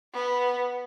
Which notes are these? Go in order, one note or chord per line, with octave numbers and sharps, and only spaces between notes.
B3